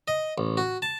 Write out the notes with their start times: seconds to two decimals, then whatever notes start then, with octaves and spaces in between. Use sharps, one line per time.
0.08 D#5
0.38 A1
0.57 F#4
0.82 A5